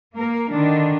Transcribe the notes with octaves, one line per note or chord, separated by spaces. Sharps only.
A#3 A#4
D3 D#3 D4